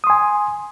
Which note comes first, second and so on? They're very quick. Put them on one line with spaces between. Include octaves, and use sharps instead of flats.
D#6 C6 G#5